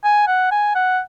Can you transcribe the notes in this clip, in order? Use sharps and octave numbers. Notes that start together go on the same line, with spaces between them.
G#5
F#5
G#5
F#5